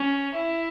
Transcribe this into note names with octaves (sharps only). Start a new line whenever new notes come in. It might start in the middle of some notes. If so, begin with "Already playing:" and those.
Already playing: C#4
E4